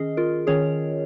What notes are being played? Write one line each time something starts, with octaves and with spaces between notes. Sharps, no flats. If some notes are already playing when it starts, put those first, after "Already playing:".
Already playing: D#3 C#4 G#4 D#5
F4 A#4
D#3 C#4 G#4 C#5